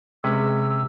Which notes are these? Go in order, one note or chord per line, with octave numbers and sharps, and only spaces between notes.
C3 G#3 C#4 B4 E6